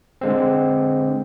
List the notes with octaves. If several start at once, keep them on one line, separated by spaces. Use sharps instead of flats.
D3 G#3 C4